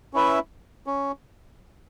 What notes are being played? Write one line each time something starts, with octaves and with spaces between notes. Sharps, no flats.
C#4 E4 B4 E5
C#4